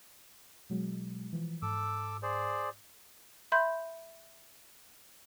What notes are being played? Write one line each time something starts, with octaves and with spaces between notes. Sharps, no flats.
B2 F#3 G#3
E3 F3
G#2 A4 D6 E6
G#4 C5 D5
E5 B5 C6 G6